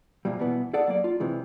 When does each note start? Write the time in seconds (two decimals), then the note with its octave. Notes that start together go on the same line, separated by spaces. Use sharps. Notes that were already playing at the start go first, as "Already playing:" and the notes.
0.25 C2 A#2 G3
0.39 B2 E3 B3
0.73 G#4 A4 D5 F#5
0.88 F#3 A#3 D5
1.04 F4
1.20 C3 E3 G#3